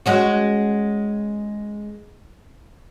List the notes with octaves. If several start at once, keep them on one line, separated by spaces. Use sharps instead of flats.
G#3 C#4 F#4